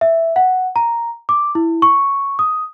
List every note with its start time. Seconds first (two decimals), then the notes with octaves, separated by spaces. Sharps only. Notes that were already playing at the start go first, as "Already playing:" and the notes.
0.01 E5
0.36 F#5
0.76 A#5
1.29 D6
1.55 E4
1.82 C#6
2.39 D#6